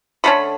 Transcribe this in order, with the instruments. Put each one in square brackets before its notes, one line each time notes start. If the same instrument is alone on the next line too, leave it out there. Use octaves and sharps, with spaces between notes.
[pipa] D3 A3 C#4 B5